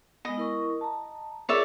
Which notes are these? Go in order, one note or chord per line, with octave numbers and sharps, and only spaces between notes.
G#3 B3 D#5
E4 A#4 C#6
A5 A#5
F4 G#4 A#4 C#5 D5 E5